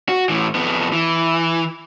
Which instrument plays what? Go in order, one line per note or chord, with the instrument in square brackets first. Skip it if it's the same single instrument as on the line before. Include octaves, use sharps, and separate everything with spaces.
[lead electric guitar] F#4
A2 E3
F2 B3
E3